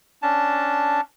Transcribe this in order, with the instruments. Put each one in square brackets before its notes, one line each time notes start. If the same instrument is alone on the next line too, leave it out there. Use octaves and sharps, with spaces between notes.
[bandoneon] C#4 D4 A5